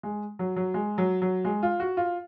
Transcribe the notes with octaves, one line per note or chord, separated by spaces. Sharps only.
G#3
F#3
F#3
G#3
F#3
F#3
G#3
F4
F#4
F4